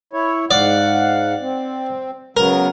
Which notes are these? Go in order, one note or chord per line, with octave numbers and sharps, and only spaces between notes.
E4 C#5
G#2 D5 F5 F#5
C4
C#3 F#3 B3 A#4